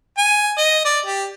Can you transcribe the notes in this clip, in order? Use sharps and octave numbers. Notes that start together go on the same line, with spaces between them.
G#5
D#5
D5
G4